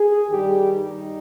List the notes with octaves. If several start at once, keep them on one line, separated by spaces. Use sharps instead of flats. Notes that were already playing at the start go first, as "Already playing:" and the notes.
Already playing: G#4
G2 D#3 G3 G4
D#4